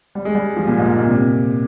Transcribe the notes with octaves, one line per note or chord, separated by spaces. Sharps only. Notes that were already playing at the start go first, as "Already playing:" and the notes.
G3
G#3
G3
F3
A#2
G#2
G#2
A#2
C3